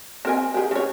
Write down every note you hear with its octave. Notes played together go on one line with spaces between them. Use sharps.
C4 A#4 G#5
G4 G#4
C#3 C#5